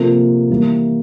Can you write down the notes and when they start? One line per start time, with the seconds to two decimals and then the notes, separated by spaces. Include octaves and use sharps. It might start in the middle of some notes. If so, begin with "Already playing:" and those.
Already playing: C3 F3 A#3 F4 A4
0.50 E3 G3 A#3 E4